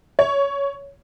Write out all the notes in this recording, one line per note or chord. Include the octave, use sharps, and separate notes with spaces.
C#5